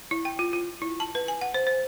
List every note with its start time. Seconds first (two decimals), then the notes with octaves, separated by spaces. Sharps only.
0.11 E4
0.25 G5
0.39 F4
0.53 F4
0.82 E4
1.00 A5
1.15 B4
1.28 G#5
1.41 F#5
1.54 C5
1.67 C5